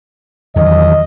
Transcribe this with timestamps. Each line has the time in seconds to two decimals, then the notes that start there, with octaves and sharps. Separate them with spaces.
0.56 E2 D#3 F#3 D#5